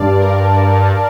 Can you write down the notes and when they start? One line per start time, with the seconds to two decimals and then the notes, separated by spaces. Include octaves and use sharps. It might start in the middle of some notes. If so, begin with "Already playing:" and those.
Already playing: G2 D5 F5 A5
0.19 A#4